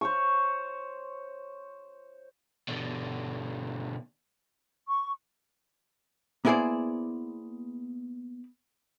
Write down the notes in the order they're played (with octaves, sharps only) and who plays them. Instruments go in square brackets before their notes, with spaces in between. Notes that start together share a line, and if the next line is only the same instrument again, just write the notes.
[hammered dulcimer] C5 C#5 C#6
[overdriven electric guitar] B2 D3
[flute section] C#6
[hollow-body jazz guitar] A#3 B3 E4 G#4 C5 D5